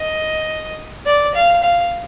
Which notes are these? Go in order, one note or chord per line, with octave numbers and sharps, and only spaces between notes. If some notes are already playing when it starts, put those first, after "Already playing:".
Already playing: D#5
D5
F5
F5